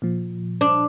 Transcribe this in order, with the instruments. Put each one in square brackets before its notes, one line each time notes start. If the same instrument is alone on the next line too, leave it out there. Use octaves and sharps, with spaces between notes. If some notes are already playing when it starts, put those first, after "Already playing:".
[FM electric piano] A#2 F3
[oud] D4